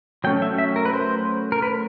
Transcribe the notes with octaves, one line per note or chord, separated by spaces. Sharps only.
F#3 A3 C#4 G5
E5
E5
A#4
B4
C5
A#4
B4